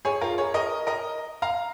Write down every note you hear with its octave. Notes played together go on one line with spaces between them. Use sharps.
G#4 C#5
F4 A#4
G#4 C#5
A#4 D#5
A#4 D#5
F5 A#5